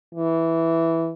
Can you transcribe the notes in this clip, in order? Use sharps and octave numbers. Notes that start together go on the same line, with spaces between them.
E3